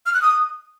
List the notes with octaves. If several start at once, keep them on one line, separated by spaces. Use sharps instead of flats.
F6
F#6
D#6